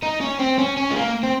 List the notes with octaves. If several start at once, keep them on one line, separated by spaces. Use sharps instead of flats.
D#4
C#4
C4
C#4
C#4
G#3
A#3
C4